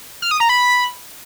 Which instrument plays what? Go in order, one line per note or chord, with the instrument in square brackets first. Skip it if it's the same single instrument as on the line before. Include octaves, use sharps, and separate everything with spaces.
[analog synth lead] F6
D#6
A#5
B5